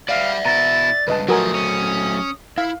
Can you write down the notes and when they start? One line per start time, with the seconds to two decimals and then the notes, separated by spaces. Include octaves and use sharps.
0.09 G3 D5 E5 F5
0.45 B2 E4 A#5 A6
1.08 C#2 G2 B4 D#5 A5
1.29 F3 F#3 A3 F#4 A#4 G#5 D#6
1.55 C#4
2.58 E4 F5